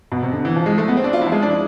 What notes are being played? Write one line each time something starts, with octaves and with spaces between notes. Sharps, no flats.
B2
C3
D3
E3
F3
G#3
A3
B3
C4
D4
F4
E4
F3
G#3
D4